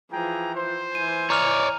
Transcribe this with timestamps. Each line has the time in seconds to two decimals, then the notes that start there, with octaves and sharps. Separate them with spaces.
0.11 E3 F3 G#4 G5 A#5
0.54 C5
0.95 E3 G#5 D#7
1.30 C#5 D5 A#5 F6 F7